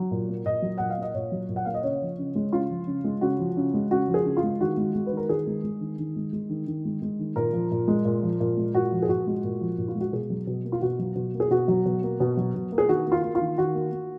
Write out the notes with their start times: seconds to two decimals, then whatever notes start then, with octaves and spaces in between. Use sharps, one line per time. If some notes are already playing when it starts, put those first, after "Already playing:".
Already playing: F#3
0.11 A#2
0.29 A#3
0.45 A#2 D#5
0.62 F#3
0.78 A#2 F#5
0.90 F5
0.97 A#3 D#5
1.14 A#2 C#5
1.32 F#3
1.49 A#2
1.56 F#5
1.65 A#3 F5
1.74 D#5
1.84 C#3 C#5
2.01 F3
2.18 C#3
2.35 G#3
2.53 C#3 F4
2.70 F3
2.87 C#3
3.04 G#3
3.21 C#3 F#4
3.39 F3
3.57 C#3
3.74 G#3
3.91 C#3 F#4
4.08 F3
4.14 G#4
4.25 C#3
4.37 F4
4.43 G#3
4.60 D#3 F#4
4.77 G#3
4.95 G#3
5.06 B4
5.12 D#3
5.17 A#4
5.29 D#3 G#4
5.47 G#3
5.64 G#3
5.81 D#3
5.99 D#3
6.16 G#3
6.33 G#3
6.49 D#3
6.67 D#3
6.85 G#3
7.02 G#3
7.19 D#3
7.36 A#2 A#4
7.53 F3
7.71 A#2
7.88 G#3
8.05 A#2
8.23 F3
8.40 A#2
8.57 G#3
8.75 A#2 F#4
8.92 F3
9.02 G#4
9.08 A#2 F#4
9.27 G#3
9.44 A#2
9.61 F3
9.78 A#2
9.88 F4
9.95 G#3
10.00 F#4
10.12 B2 G#4
10.30 F#3
10.47 B2
10.65 A#3
10.72 F4
10.81 B2 F#4
10.99 F#3
11.16 B2
11.34 A#3
11.40 G#4
11.50 B2 F#4
11.68 F#3
11.86 B2
12.03 A#3
12.20 B2
12.37 F#3
12.55 B2
12.72 A#3
12.78 G#4
12.88 D#3 F#4
13.07 A#3
13.12 F4
13.24 A#3
13.35 F4
13.41 D#3
13.57 D#3 F#4
13.75 A#3
13.92 A#3